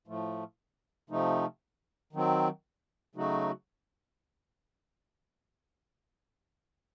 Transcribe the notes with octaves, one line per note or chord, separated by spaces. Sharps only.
A2 F3 A3
C3 F3 A3 D#4
D#3 F#3 C4
C#3 F#3 A3 D#4 F#4